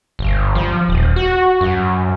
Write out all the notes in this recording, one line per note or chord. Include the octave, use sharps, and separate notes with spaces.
G1
F3
D#1
F#4
F#2